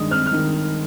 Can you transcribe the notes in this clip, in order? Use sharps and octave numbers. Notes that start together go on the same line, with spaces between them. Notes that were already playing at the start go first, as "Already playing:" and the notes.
Already playing: G2 D#3 G#3 D#6
C4 F6
F6
D#3